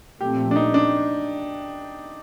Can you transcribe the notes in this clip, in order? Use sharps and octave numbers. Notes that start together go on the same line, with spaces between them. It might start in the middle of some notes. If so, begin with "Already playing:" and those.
A#2 F3 A3 C4 G4
D4
D#4
D4